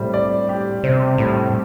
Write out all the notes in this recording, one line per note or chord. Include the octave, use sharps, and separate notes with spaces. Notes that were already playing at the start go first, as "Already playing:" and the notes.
Already playing: A2 G3 C4
D5
G4
C3 C4
A2 G3